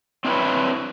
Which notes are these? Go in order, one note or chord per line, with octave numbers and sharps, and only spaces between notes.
C4 D4 E4 A#4 B4 C#5